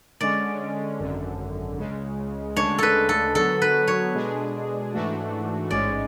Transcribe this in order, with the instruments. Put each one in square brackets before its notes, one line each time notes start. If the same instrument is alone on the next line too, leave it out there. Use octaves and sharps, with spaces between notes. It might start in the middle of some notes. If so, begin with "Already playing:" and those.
[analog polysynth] D3 G#3 C#4 [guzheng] D5
[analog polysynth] G#1 F#2 D3
C#2 C#3 G#3
[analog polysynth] D2 C#3 G#3 D4 [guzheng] C#5
[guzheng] A4 B4
A4
[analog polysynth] D3 F#3 B3 F#4 [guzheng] A4
[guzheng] B4
C#5
[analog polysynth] B2 G#3 D4 G#4
G#2 E3 A3 D4 F#4
[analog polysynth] A1 G#2 G#3 C#4 [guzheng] D5